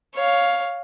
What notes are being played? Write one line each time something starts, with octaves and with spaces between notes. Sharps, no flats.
C#5 F5